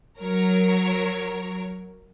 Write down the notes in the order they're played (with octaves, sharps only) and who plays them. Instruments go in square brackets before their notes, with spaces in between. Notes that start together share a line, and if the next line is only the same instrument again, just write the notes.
[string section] F#3 A#4 C#5